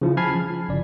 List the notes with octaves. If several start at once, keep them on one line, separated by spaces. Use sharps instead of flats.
C#3 F3 E4 F4
G#5 A5 B5 F6 G#6 C7
F3
G1 C#3 D5